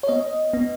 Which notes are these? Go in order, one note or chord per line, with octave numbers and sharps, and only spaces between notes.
C#5
B3 D#5
B3